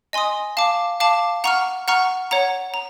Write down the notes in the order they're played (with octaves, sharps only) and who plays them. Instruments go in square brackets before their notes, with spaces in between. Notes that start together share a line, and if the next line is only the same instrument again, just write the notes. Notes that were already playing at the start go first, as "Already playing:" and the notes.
[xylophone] D#5 G#5 C6 D#6
F5 A5 D6
F5 A5 D6
F#5 A#5 C#6 F6
F#5 A#5 C#6 F6
C#5 F#5 A#5
A#5